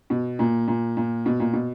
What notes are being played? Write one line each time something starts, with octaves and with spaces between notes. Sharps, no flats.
B2
A#2
A#2
A#2
B2
A#2
B2